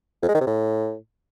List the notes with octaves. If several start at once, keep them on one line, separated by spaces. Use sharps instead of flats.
F2
G#3
D#3
C3
A2